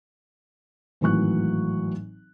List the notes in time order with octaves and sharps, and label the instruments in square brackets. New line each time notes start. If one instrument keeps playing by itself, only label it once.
[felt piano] G#1 A2 E3 F#3 C#6 F#6